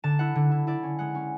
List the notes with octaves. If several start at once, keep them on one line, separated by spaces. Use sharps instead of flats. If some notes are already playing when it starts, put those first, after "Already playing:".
D3 A5
E4 F#5
D3
E4
E4 D5
C#4
G#3 F#5
C#4